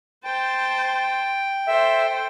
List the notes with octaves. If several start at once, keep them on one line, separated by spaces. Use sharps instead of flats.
C5 G5 A5
A4 C5 E5